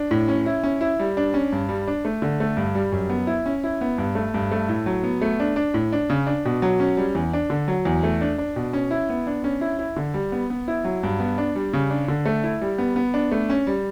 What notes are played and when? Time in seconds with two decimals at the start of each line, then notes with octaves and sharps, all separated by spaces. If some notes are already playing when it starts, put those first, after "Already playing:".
Already playing: D4
0.11 A2
0.28 C#4
0.46 E4
0.64 C#4
0.81 E4
0.99 G3
1.17 D4
1.34 C#4
1.52 G2
1.69 G3
1.87 D4
2.05 A3
2.22 D3
2.40 A3
2.57 G2
2.75 G3
2.92 F#2
3.10 B3
3.27 E4
3.46 C#4
3.64 E4
3.81 B3
3.98 G2
4.15 A3
4.34 G2
4.52 A3
4.69 A2
4.86 F#3
5.04 B3
5.22 A3
5.40 D4
5.56 D4
5.74 A2
5.93 D4
6.10 C#3
6.27 D4
6.45 B2
6.62 F#3
6.80 C#4
6.97 G3
7.15 E2
7.33 D4
7.50 D3
7.68 F#3
7.85 E2
8.03 A3
8.21 D4
8.38 D4
8.56 B2
8.73 C#4
8.91 E4
9.10 B3
9.27 D4
9.44 C#4
9.61 E4
9.79 E4
9.96 D3
10.14 G3
10.32 B3
10.50 B3
10.68 E4
10.84 F#3
11.03 G2
11.20 B3
11.38 D4
11.55 G3
11.73 C#3
11.90 D4
12.08 D3
12.26 A3
12.44 E4
12.61 G3
12.78 B3
12.96 B3
13.14 D4
13.32 A3
13.50 C#4
13.67 G3